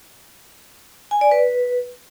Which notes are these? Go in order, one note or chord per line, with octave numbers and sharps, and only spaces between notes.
G#5
D5
B4